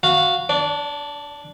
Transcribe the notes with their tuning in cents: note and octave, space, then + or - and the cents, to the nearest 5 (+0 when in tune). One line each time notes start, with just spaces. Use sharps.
F#4 -10 F5 +0 A#5 +45
D4 +0 D5 -40